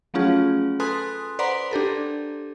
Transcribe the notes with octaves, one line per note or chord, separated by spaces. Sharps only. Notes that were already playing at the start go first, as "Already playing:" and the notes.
F3 F#3 A3 C#4 F4 G#4
A4 B4 G#5 C6 D#6 F#6
B4 C5 D5 F#5 A#5 C6
D4 G4 A4 A#4